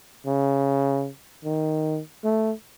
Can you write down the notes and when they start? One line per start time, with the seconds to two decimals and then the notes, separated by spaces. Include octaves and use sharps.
0.26 C#3
1.45 D#3
2.24 A3